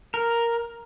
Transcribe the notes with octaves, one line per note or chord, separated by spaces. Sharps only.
A#4